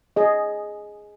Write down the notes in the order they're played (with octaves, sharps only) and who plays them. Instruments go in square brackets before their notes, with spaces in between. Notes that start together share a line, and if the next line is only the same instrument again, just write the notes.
[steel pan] G#4 D#5